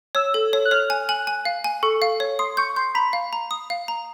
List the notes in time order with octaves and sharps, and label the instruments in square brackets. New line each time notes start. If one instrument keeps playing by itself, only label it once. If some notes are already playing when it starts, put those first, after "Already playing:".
[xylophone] C#5 [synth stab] E6
[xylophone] A4
C#5
[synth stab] F#6
[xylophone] C#5 [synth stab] F6
[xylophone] G#5
[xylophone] G#5 [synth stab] F#6
[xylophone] G#5
F5
G#5
[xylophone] A4 [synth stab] C#6
[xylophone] F5
C#5
[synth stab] C6 [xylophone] D#6
[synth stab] C#6 [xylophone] G6
[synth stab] C6 [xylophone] G6
[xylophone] A#5 [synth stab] B5
[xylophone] F5
A#5
D#6
F5
A#5